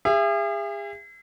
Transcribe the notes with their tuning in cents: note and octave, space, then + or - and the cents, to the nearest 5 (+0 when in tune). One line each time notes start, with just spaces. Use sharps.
G#4 -40 E5 +35